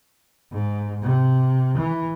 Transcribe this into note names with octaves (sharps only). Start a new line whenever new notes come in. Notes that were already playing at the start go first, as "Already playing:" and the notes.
G#2
C3
E3